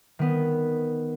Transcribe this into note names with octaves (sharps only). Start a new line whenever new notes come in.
D#3 B3